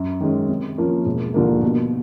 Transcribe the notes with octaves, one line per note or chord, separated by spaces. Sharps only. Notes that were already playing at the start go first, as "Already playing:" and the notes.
Already playing: F#2
D#3 G#3 C#4
C3
F3 A#3 C#4
E1
D#2 D3 F3 A#3
B2